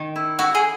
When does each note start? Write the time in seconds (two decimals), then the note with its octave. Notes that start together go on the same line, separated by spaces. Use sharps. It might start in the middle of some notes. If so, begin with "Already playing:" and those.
Already playing: D#3
0.16 E4
0.39 E4 F#4
0.55 G#4